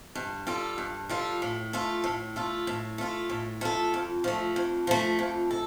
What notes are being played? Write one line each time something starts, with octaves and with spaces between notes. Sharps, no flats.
G2
G3 F4 A4
G2
G3 F4 A4
A2
A3 F4 A4
A2
A3 F4 A4
A2
A3 F4 A4
A2
A3 F4 A4
F2
F3 A3
F2
F3 A3
F2
A4